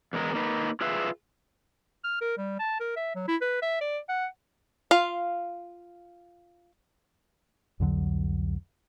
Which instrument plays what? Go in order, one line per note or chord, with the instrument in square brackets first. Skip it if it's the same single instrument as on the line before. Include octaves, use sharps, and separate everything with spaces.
[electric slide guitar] E2 G#3 A#4
A#3 D#4 B4
F4 G#4 B4 E5 F5
[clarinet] F6
A#4
G3
A5
A#4
E5
F#3
E4
B4
E5
D5
F#5
[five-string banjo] F4 F5
[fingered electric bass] C2 F2 D3 F#3